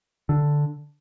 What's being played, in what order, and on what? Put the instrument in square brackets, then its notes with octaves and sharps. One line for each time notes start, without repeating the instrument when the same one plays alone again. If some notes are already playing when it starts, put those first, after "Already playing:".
[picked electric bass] D3